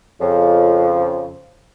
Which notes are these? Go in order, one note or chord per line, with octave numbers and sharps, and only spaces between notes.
F2 C#3 F3